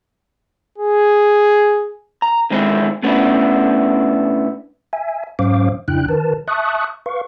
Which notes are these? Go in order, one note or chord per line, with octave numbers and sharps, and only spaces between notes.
G#4
A#5
D3 D#3 G#3 C4 D#4 E4
B2 A3 B3 C#4 D4 E4
E5 G#5
G#2 F#3 C#4 C5 F5 D6
F2 C#3 D4 E4 G5 F#6
D#3 A#4 B4 A5
E5 A5 C#6 D#6 F#6
B4 F5 C#6